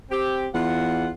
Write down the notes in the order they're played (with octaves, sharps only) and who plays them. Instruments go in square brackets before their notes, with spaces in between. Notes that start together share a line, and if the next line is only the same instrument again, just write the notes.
[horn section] C4 G4
[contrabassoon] E2 [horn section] F4 F#5